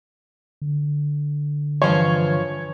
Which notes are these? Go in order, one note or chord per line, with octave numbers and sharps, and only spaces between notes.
D3
G2 E3 F3 C5 C#5